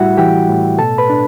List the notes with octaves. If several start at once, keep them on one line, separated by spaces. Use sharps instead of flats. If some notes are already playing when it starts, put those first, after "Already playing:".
Already playing: A2 G3 E4 F#4 E5 F#5
E3 G4 G5
A2
B2 A4 A5
B4 B5
D4